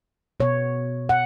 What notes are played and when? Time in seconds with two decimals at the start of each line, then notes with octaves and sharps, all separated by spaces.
0.40 B2 B3 C#5
1.09 F#5